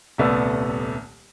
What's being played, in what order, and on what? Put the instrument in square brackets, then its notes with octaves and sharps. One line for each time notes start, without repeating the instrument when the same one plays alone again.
[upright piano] D#1 C2 A3 B3 D5 E6